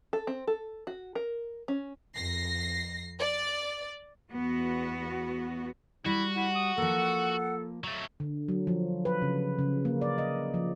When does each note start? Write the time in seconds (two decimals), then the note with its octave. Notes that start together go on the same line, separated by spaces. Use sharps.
0.13 A4
0.27 C4
0.47 A4
0.87 F#4
1.15 A#4
1.68 C#4
2.15 F2 A#6 C7
3.20 D5
4.31 E2 B3 F#4
6.06 G3 E4 F#4
6.36 E4 F#5
6.55 D#6
6.78 F3 A#3 A4
7.84 F#3 A3
8.20 D3
8.48 F#3
8.67 F3
9.05 B4
9.22 C#3
9.59 C#3
9.85 A#3
10.01 D5
10.18 D#5
10.54 F3